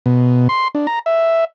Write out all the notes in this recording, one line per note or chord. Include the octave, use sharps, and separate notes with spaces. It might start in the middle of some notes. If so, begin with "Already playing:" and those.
B2
C6
D4
A#5
E5